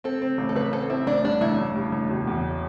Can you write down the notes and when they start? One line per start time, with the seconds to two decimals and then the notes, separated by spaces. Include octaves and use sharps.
0.04 C4 A4
0.22 C4
0.38 A1
0.49 A4
0.56 A1 B4
0.73 C4 A4
0.90 C4 E4
1.07 A1 D4
1.24 G2 D4
1.41 A1 E4
1.58 A1
1.75 G2
1.92 A1
2.09 E1
2.27 E2